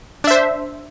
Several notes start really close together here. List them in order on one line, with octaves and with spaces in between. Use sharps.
D4 E5 C5